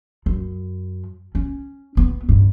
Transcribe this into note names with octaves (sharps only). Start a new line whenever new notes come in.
F#2
C#4
B3
G2